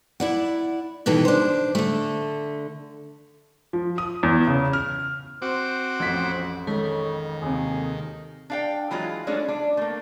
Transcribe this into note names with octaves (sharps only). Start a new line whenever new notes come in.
E4 D5 F#5
B2 D#3 E3 G4 A4
D4 C5
D3 A3
F3
D#6
E2
C#3
F6
C4 F#4 C5 D6
A1 F2 F3 B6
D#3 G#3 A4 C#5
D#2 C3 G#4
D4 F5 G5
E3 F#3 G#3 F4
G#3 A3 C#4 D4
D4
A3 A#3